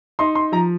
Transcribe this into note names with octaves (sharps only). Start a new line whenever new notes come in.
D#4 C6
C6
F3 A#5